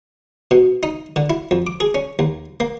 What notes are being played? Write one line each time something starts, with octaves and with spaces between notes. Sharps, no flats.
B2
D#4
D3
E4
F2
D6
G#4
C#4
D#2
A#3